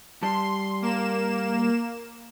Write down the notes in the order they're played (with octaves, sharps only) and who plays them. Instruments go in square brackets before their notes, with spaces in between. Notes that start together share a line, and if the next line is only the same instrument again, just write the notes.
[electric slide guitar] G3 G4 A5 [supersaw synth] C6
[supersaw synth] A#3 E7